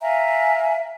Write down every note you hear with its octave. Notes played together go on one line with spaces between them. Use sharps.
E5 F5 G#5 A#5